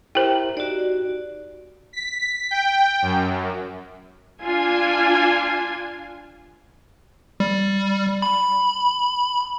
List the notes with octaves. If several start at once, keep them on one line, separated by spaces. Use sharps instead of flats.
E4 G4 A#4 C5 G5
D#4 F#4 G4 D5
B6
G5
F#2
D4 F4 G#5
G3
B5